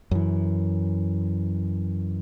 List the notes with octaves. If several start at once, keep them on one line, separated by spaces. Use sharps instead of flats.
F#2 E3